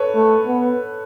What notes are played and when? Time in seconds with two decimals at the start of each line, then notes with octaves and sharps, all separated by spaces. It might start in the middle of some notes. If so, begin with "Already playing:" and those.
Already playing: A4 B4 C#5
0.14 A3
0.46 B3